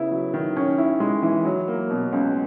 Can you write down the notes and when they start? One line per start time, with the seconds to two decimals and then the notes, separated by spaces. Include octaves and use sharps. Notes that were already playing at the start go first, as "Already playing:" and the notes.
Already playing: C#3 B3 E4
0.11 F#3
0.34 D#3
0.57 C#4
0.78 E4
1.00 G#3
1.23 E3
1.45 F#3
1.68 A#3
1.90 B2
2.12 C#2